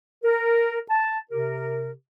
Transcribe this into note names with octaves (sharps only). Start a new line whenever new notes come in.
A#4
A5
C3 G4 A#4